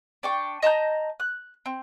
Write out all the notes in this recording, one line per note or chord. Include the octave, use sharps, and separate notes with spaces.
D4 G5 C#6
D#5 A5 A#5 G6
F#6
C4